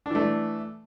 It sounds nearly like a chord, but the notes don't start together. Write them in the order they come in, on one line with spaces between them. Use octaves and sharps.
D4 E3 A3